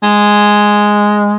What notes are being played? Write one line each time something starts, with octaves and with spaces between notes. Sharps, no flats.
G#3